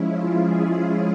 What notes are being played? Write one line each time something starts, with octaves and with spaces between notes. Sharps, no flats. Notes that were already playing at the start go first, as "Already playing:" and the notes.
Already playing: F3 G#3 C#4 E4
F4
G#4